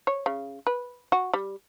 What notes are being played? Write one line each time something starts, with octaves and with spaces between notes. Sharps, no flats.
C#5
C#3
B4
F#4
G3